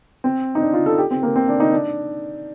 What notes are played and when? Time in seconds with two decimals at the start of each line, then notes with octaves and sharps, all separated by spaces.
0.24 C4
0.55 D#4
0.61 D4
0.73 F4
0.86 A4
0.98 G4
1.11 C4
1.23 A#3
1.36 C4
1.48 D4
1.60 D#4
1.72 D4